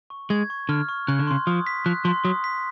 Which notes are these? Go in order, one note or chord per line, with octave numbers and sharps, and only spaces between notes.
C#6
G#3 G#6
C#6
D3 F6
C#6
C#3 F#6
D3
C#3 C6
F3 D#6
B6
F3 F#6
F3 C6
F#3 D#6
B6